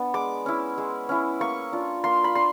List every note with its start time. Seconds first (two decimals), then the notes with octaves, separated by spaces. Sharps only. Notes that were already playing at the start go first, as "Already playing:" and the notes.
Already playing: B3 D4
0.14 G#3 D6
0.46 C#4 E4
0.78 G#3
1.09 C#4 E4
1.40 A#3 C#6
1.73 D4 F4
2.04 A#3 C6
2.24 B5
2.35 D4 C6